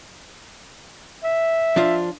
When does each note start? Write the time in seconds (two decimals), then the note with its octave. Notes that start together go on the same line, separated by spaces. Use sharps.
1.24 E5
1.76 F3 D4 F4